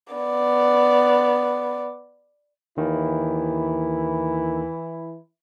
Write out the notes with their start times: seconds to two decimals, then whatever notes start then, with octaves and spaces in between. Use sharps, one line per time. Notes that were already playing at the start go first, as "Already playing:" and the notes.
0.14 B3 D5
2.77 D#2 D#3 E3 E4